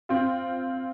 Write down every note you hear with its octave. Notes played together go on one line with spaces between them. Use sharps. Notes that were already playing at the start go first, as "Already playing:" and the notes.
C4 F4